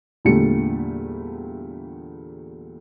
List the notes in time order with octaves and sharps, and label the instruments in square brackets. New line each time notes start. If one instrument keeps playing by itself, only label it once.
[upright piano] E2 A#2 D3 G3 A3 C#7